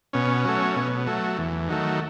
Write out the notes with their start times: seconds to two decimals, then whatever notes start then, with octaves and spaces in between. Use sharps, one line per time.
0.13 B2 C#4
0.45 F#3 A3
0.76 B2
1.07 F#3 A3
1.38 E2
1.69 D#3 F#3 A3